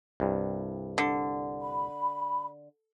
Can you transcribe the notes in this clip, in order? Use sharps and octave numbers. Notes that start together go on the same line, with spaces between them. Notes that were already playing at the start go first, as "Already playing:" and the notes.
C2 G2
D3
B5